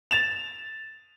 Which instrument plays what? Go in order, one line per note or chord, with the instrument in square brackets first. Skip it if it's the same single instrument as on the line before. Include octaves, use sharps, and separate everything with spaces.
[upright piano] A6 E7 F7